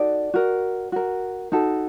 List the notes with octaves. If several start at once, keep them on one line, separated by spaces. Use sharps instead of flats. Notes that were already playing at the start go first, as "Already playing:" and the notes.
Already playing: D#4 F#4 A4 D5
F#4 A#4
F#4 A#4
D#4 F#4 A4